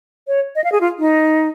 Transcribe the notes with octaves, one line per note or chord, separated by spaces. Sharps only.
C#5
D#5
F5
G#4
F4
D#4